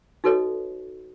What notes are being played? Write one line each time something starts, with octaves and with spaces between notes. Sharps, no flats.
D#4 F#4 A4 B4 C#5 D#5